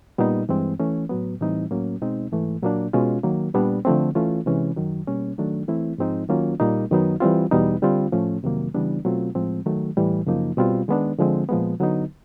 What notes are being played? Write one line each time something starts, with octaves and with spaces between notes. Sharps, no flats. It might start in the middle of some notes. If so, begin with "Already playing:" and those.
A#2 G3 B3 D#4
G2 E3 G#3 C4
E3 A3 C#4
A2 F#3 B3
A2 E3 G3 C4 D#4
A2 F#3 A#3 C#4
B2 G#3 C4 D#4
G#2 E3 A3
A#2 F#3 A#3 D4
B2 G#3 C#4 F4
D#3 F#3 A#3
A#2 G3 B3 D4
D3 F3 A3 C4
E3 A3 C#4 F4
C3 E3 G#3 C#4
F#2 D#3 F#3
B2 G3 A#3 C#4
D#3 F#3 A3 D4
E3 A3 C4 E4
G#2 F3 G#3 C4 D#4
D#3 F#3 A#3 C#4 F4
A#2 G3 A#3 D#4
F#2 D#3 F#3 B3 D#4
E3 G3 C4 F4
E2 B2 G3 B3 D#4
D3 G3 C4 F4
A2 F3 A3 C#4
F2 C3 D#3 F#3 A#3
C#3 E3 G3 B3 D4
B2 F#3 A3 C4 F4
A2 F3 G#3 C4
D#3 F#3 A3
A2 E3 G3
F#2 C#3 F3 A#3 D#4
B2 G3 C4 F4
D#3 G#3 B3 D4
D3 F3 G#3 C4
A#2 F3 G#3 B3
D3 F#3 B3 D#4